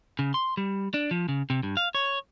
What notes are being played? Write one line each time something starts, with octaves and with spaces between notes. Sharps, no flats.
C#3
C6
G3
D4
F3
C#3
C3
G2
F5
C#5